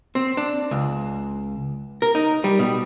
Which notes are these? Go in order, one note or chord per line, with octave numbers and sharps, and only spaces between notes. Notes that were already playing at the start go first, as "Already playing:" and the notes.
C4
D4
C#2
A#4
D#4
G3
B2